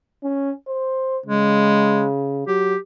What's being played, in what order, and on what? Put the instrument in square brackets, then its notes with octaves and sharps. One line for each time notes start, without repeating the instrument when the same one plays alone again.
[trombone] C#4
C5
[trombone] C#3 [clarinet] G#3
[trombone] F#3 [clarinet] G4